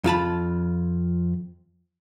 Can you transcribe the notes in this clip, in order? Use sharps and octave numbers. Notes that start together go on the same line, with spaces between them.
F2 F4 A5 B5